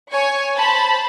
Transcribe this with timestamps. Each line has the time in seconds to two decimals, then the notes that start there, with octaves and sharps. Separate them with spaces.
0.12 C#5 G#5 C#6
0.56 C5 A5 B5